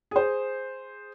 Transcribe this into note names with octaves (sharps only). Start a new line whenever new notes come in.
G#4 C5